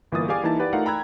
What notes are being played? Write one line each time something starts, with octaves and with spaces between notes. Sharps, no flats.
G1 E3 A#3 F4 D#6 A6
G4 G#4 D5 F5 G#5 D6
E3 A#3 D#4 E4 A5 A6
G4 B4 D5 F#5
A3 D#4 F4 A#4 F5 F#5
G5 A#5 B5 E6 F#6 G#6